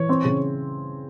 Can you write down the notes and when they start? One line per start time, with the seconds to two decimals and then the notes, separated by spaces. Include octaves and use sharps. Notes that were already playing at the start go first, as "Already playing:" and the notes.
Already playing: E3 C#5
0.09 C4
0.25 C#3